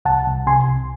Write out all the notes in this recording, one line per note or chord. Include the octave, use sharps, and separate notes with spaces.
C2 F#5 A5
C2
C3 G#5 C6
C2